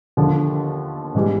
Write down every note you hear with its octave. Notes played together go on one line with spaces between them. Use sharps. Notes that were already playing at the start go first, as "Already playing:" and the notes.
D#2 D3 F3
G#2 E3 G3